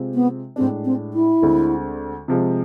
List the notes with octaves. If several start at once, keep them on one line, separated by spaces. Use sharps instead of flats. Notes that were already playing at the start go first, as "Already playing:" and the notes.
Already playing: C3 G#3 C4 F4
B3
A2 G#3 C4 D4
C4
E4
D2 D3 G#3 C4
C3 F3 G#3